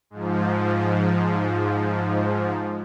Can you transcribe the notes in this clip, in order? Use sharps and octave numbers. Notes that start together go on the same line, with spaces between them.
G#2 F3